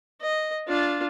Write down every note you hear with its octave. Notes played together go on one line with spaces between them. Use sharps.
D#5
D4 F4